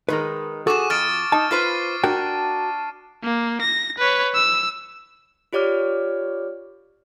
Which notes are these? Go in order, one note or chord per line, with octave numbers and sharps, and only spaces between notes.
D#3 G#3 A#4 B4
F#4 G#4 A4 C#6 D6 E7
F2 F6 A6 D7
D#4 A5
F4 B4 C5 A6 C7 D#7
D4 F#4 A#4 G5
A#3
A#6
B4 C#5
E6
F4 G4 C#5 D5 D6 F6